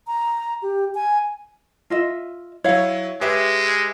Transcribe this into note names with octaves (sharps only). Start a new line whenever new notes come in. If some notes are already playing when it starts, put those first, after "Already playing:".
A#5
G4
G#5
F4 D#5 E5
F#3 E4 C#5 F5
G#3 G4 B4 E5